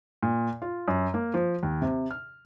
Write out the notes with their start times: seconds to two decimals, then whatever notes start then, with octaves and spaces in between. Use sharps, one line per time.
0.23 A#2
0.62 F4
0.88 F#2
1.14 A#3
1.34 F3
1.63 D#2
1.82 C3
2.11 F6